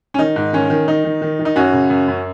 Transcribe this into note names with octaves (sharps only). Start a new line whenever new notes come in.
C#4
D#3 D#4
G#2
D#3 C#4
D#3
D#3 D#4
D#3
D#3
D#3
D#4
F#2 C#4 F#4
C#3
F#2
F#2